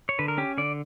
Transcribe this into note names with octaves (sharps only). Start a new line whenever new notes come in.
C#5
D3 B4
A#4
C#4 G4
D3 D5